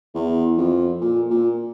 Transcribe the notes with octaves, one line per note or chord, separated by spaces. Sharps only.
E2
F2
A#2
A#2